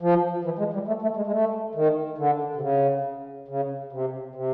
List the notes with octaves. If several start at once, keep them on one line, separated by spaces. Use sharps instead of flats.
F3
E3
G#3
G3
A3
A3
G#3
G#3
A3
D#3
D3
C3
C#3
C#3
C3
C3